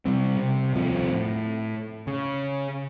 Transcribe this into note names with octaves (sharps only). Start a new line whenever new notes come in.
C3 G3 C4
C3
D#1 C2 F3 C4
A2
C#3